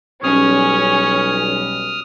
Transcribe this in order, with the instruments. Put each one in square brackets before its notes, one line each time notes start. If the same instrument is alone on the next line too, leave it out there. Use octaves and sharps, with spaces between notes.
[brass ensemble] B1 G3 [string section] C#4 [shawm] C#5 [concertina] D#6 F6